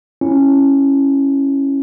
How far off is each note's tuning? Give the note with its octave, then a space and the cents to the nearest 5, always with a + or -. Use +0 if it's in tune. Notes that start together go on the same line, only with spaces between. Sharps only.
C#4 -15 E4 +0